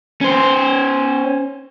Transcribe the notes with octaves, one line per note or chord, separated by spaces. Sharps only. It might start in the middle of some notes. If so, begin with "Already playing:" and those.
C#4 C5